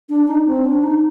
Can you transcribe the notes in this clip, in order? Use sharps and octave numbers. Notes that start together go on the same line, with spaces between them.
D4
D#4
C4
D4
D#4